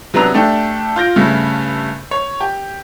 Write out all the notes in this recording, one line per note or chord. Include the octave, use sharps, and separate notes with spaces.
C3 F#3 B3 D4 A#5 F7
A3 D4 G4 A4
F4 G6 A#6 D7
G2 C#3 A3
C#5
G4